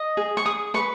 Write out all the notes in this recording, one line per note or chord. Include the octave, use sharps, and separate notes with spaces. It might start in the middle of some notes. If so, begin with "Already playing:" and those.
Already playing: D#5
G#4
C#6
G#4 D#6
B4 C#6